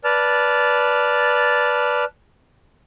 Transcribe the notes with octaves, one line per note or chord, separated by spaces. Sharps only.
B4 D5 A5 F6